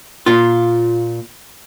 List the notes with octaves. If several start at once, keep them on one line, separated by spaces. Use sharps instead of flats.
A#2 F4